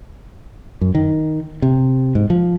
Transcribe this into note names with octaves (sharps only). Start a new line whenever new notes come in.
F#2
D#3
C3
G#2
F3